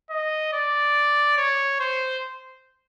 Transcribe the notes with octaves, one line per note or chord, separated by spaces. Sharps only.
D#5
D5
C#5
C5